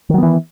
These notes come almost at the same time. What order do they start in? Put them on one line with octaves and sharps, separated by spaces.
D#3 F#3 B3 E3